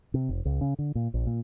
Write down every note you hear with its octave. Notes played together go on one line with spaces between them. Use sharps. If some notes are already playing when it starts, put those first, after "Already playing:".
C3
F1
C#2
C#3
D3
A#2
A#1
A#2